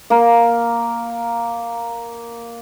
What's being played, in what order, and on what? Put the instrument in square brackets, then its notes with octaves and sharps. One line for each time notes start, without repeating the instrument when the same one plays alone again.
[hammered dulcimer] A#3 A#4